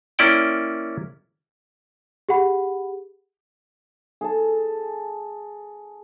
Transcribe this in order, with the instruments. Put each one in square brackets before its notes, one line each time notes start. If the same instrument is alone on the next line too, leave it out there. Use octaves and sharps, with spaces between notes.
[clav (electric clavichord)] A#3 C#4 E4 D5 G5
[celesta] G4 G#4 F#5 B5
[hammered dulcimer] G#4 A4 A5